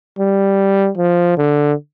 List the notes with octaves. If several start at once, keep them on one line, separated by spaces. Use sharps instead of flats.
G3
F3
D3